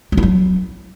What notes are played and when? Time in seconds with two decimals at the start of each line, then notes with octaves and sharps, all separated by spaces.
0.12 F#3
0.17 E4
0.23 F#3